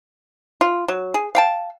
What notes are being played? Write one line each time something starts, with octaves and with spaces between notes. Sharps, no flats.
F4
F#3
G#4
F5 G5 A5